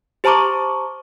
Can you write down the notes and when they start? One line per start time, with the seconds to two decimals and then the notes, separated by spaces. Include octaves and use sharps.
0.24 G4 C5 A5 A#5 C#6 D6